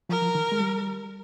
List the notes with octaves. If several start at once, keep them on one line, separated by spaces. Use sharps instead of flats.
F3 A#4
F3
D#3
G#3
G3